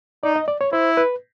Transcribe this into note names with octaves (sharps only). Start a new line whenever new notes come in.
D#4 D5
D#5
D5
C#5
E4 C5
B4